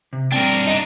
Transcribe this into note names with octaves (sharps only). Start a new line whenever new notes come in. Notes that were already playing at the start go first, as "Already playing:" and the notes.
C3
G2 C4 D4 A#4 G5
D4 D#4 D#5